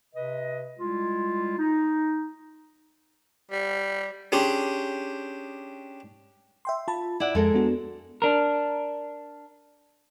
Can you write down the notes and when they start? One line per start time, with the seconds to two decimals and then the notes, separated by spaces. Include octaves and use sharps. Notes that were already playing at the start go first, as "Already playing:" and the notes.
0.14 C3 B4 D#5
0.79 G3 G#3 E4 F4
1.58 D#4
3.51 G3
4.32 C#4 D4 G4 G#4 C5
6.65 E5 G5 C6
6.88 F4 A5 B5
7.20 E4 D5 F#5
7.35 F2 G#3 A4 A#4
7.54 B3 D4 F#4
8.22 D4 A#4